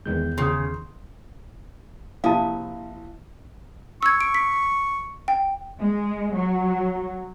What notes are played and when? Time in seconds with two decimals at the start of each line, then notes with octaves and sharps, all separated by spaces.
0.06 E2 D#3 G#3 G6
0.38 C#3 C6 D#6
2.24 A#1 C3 E4 F5 A5 D#6
4.03 C#6 E6 G#6
4.21 D7
4.35 B6
5.28 G5
5.80 G#3
6.35 F#3